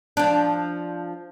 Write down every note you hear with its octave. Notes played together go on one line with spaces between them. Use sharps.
F3 D4